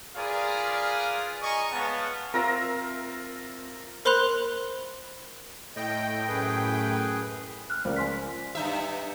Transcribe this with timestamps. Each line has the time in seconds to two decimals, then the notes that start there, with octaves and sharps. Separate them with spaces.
0.17 F4 G#4 A#4 B4 D5 F5
1.43 D#5 G#5 A#5 C#6
1.72 G#3 B3 C#5 F5 F#5 A5
2.34 C4 F4 A#4 E5 A#6
4.05 A#4 C5 B5 C6 F#6 F7
5.76 A2 D#5 G5
6.28 F#2 G#4 B4
7.70 F6 F#6
7.85 C#2 A#4 C5 D5
7.96 G#5 C6 B6
8.55 G2 D#4 E5